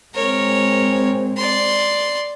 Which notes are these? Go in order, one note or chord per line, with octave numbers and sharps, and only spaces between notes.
G#3 C4 A#4 C#5
D5 C6